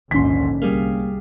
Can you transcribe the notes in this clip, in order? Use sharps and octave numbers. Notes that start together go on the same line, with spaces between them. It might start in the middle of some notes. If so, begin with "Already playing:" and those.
A#1 D#2 G#2 D3 C#4 C6 B6
C2 G3 A#3 G#4 F5